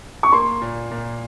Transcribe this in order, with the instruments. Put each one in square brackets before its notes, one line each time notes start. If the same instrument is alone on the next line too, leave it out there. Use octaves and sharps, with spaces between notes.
[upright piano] C#6
[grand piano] A#3 [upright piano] C6
[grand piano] A#2
A#2